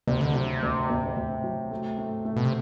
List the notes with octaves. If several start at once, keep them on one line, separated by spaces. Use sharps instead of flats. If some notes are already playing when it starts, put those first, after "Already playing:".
D2 C3
D3
C3 F#3
D2
D2
D2
F#3
A3
A3
A3
B2
C3